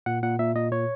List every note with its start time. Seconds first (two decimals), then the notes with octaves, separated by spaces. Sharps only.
0.06 A#2 F#5
0.23 A#2 F#5
0.39 A#2 E5
0.55 A#2 D#5
0.72 A#2 C#5